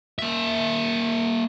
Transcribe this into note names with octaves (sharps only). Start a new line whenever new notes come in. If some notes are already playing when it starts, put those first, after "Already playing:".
A#3 E5